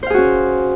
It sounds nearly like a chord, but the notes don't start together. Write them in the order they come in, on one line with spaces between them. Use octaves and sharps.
C5 F5 G#4 F#4 C#4